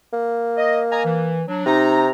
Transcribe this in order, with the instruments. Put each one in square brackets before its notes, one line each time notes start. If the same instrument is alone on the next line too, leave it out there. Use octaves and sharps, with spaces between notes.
[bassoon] A#3
[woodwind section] D#5
D#5 G#5 A#5
E3
F#3 D4
[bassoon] C3 [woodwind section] D#4 A#5